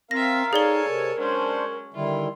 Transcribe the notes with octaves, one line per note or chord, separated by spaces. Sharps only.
C4 F4 A#4 E5 F5 A#6
D#4 G#4 A4 C#5 D5 G#5 G7
C3 A#4
F#3 G#3 C#4 D4 C5
D3 D#3 G3 E4 F4